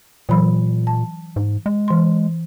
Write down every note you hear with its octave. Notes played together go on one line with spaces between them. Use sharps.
A#2 E3 F#3 B5
A5
G#2
G#3
E3 C6